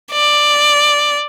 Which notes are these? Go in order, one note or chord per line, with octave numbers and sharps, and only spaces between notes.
D5